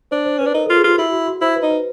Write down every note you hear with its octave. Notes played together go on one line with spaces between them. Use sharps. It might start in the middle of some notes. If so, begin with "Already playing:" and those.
D4 C5
C5
C#4 B4
D4
D#4 A#4
A4
F4
G#4
F4 G4
E4 F#4
F#4
F#4
E4 C5
B4
D#4
B4